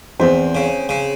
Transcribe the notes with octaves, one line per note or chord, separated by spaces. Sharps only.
E2 C4 C5
C#3
C#3